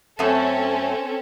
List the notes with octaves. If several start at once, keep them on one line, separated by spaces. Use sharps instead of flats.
F#2 A3 C4 C#4 A4